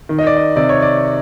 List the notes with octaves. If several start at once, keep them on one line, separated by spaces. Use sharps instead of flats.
D#3
D#5
D5
D#5
C3 D5
C#5
D5